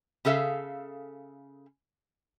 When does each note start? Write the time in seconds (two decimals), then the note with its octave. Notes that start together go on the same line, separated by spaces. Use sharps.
0.25 C#3 G#4 A4 E5 F5